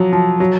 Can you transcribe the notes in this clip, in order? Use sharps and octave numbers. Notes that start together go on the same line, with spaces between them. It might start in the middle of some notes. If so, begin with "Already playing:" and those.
Already playing: F3 F#3
F3
F#3